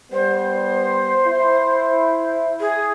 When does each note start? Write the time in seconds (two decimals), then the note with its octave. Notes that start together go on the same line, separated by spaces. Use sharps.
0.12 G3 B3 C5
1.27 E4
2.60 G#4